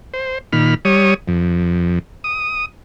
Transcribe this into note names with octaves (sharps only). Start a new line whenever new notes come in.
C5
A#2 D#3 B5 F6
G3 C#5 D#6
F2
D#6